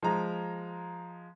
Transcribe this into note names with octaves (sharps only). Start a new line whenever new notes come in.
F3 G#3 A#5